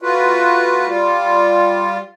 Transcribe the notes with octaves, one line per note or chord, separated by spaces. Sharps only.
A3 F4 F#4 B4
G3 F4